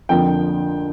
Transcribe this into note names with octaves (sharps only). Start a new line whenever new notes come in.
F2 D3 F3 A#3 G5